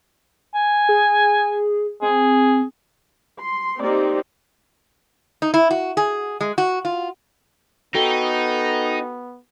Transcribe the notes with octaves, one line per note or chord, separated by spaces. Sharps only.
G#5
G#4
C4 G#4
C6
A#3 C4 D#4 G4 D5
D#4
E4
F#4
G#4
G#3
F#4
F4
B3 D#4 F#4 A4 G5